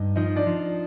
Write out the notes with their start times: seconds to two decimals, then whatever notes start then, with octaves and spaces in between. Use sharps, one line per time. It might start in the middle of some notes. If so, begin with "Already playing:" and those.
Already playing: G2 D#4 D#5
0.16 F3 D#4 D#5
0.36 D4 D5
0.47 F3